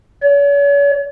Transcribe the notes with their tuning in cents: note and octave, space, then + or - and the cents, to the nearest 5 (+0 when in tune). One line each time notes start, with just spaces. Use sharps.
C#5 +40